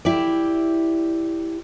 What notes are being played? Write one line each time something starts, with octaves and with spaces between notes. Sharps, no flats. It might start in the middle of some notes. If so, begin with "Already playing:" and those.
E4 G4 D5